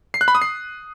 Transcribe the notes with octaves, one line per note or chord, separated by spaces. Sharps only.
C7
F#6
B5
D#6
C7